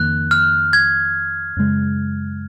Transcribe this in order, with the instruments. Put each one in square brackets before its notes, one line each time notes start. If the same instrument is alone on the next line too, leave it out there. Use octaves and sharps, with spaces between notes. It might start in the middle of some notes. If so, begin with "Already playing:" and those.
Already playing: [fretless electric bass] F2 D#3 A#3 [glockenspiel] F#6
[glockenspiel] F6
G#6
[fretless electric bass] F#2 C#3 G#3